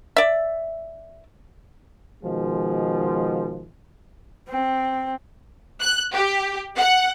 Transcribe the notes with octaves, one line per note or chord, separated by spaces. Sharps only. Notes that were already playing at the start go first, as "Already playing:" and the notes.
D5 E5
B2 D#3 F3 G#3
C4
F#6
G4
F#5